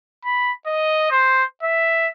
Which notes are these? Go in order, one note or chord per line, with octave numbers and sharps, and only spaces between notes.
B5
D#5
C5
E5